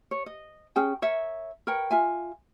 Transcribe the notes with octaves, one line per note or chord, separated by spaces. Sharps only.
C#5
D#5
C#4 G#4 G5
A#4 C#5 E5
A#4 B4 C#5 G5
F4 E5 G#5